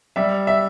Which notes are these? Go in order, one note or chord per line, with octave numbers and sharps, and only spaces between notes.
G3 E5
E5